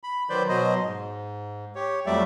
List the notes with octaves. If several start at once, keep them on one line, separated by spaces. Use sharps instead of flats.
B5
D#3 F#3 B4 C5 D5 G6
B2 F#3 C5 D#5
G#2
G4 C#5
F2 F#3 G3 A3 D5 E5